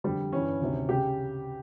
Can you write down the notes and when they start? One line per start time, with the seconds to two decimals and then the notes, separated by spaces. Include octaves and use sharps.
0.04 F2 D3 G3
0.32 G2 E3 C#4
0.61 D2 C3 D#3
0.89 C#3 G4